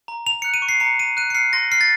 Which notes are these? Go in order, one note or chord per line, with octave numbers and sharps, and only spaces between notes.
A#5
A#5 F7
F#6 C#7
D#7
C#6
C7
A#5 C#7
A#5 D#7
F#6 D#7
C#7
F6 C7
C6 A#6
F6 C7
A6